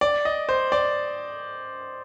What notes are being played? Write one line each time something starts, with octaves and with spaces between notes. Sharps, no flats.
D5
D#5
C5
D5